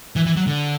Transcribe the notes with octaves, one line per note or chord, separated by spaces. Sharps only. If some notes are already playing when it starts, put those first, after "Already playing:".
E3
E3
F#3
D3